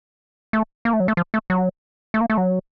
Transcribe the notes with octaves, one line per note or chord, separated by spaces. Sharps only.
A3
A#3
A3
F#3
A3
F3
A3
F#3
A3
A#3
A3
F#3